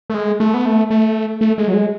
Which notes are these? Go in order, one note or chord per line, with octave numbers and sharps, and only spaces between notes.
A3
G#3
A3
B3
A3
A3
A3
G#3
F#3
G#3